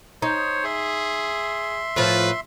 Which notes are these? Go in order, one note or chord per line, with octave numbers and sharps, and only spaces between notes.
D#4 C5 C#5
G#4 E5 C6
A2 F3 B4